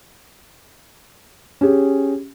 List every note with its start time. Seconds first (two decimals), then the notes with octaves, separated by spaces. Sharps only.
1.61 C#4 G4 G#4